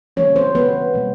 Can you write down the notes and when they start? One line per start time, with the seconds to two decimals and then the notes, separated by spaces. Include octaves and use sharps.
0.17 C#3 E3 G3 A#3 C#4 C#5
0.36 C4 C5
0.55 C#3 E3 G#3 B3 B4
0.94 B2 G3 A#3